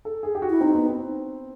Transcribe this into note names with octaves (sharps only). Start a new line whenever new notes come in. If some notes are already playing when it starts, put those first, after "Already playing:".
A4
G#4
G4
F#4
E4
C4 D#4
B3
C4